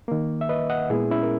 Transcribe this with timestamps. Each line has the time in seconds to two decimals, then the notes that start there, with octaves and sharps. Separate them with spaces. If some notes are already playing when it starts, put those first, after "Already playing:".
0.08 D#3 A#3
0.41 E5
0.49 B4 D#5
0.69 D#5 F#5
0.90 A#2 G#3 B3 E4 G#4
1.10 C#4 E4
1.23 A#4